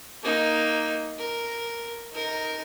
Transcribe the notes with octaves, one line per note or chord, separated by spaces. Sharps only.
A#3 D#4
A#4
D#4 A#4